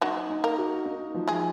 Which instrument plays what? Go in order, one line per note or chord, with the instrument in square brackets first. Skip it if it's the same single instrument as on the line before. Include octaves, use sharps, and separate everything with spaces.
[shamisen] F#3 F#4 [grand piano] D#4
[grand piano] D#4
[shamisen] A#3 A#4
[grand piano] F#4
D#4
F3
[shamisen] G#3 G#4